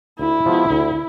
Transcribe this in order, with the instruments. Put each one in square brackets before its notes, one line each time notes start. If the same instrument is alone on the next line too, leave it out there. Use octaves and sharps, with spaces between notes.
[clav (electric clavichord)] D2 [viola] E4
[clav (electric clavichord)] C3 F3 G#3 B3
D2